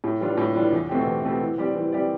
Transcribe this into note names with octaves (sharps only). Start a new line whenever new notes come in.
A2
E3 G3 D4 F4
A2
E3 G3 D4 F4
E2
B2 A3 C4 G4
E2
B2 A3 C4 G4
E3
G3 C4 G4 D5
E3
G3 C4 G4 D5